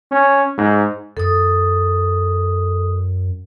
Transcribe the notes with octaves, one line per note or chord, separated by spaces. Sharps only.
C#4
G#2
F#2 A4 D#6